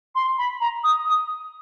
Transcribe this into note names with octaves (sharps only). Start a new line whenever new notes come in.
C6
B5
A#5
D#6
D#6